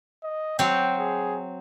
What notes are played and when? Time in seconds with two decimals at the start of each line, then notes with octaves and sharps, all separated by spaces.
0.24 D#5
0.59 F#3 C4 G5
0.99 G#4